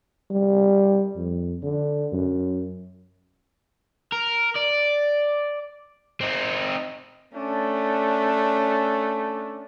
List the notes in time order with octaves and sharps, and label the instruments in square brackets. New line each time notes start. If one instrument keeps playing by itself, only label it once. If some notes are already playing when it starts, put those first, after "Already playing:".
[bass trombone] G3
F2
D3
F#2
[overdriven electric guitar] A#4
D5
C4 D#4
[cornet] A3 [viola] C#4 D4